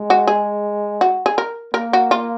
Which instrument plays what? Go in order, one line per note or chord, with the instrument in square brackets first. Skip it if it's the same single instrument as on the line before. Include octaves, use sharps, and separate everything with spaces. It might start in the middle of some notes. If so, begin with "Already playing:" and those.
Already playing: [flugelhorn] G#3
[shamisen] F#4
G#4
F#4
G#4
A#4
[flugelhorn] A#3 [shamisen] A#4
[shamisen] F#4
F4